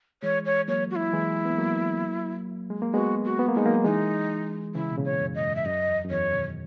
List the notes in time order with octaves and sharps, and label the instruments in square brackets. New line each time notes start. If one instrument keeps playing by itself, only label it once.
[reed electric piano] E3 G#3 [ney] C#5
[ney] C#5
[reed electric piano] F#3 A#3 [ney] C#5
[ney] F#4
E4
[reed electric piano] E3 G#3
B3
F#3 A#3
G#3
A#3
[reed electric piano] G#3 B3 [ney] F#4
[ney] F#4
[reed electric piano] B3
A#3
[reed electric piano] G#3 [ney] D#4 E4
[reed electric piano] F#3 A#3
[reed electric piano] E3 G#3 [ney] D#4
[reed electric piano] C#3 E3 [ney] E4
[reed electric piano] B2
A#2 C#3
[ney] C#5
[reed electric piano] F#2
[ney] D#5
[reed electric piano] G#2
[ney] E5
[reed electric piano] F#2 [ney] D#5
[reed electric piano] E2
F#2
[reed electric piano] E2 [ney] C#5
[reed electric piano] B2 D#3